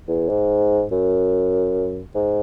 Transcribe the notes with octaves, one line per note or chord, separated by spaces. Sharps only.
E2
G#2
F#2
G#2